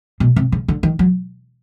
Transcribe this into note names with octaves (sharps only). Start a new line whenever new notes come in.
B2
C3
C#3
D3
D#3
F#3